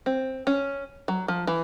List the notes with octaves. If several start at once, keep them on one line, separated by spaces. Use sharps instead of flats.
C4
C#4
F#3
F3
E3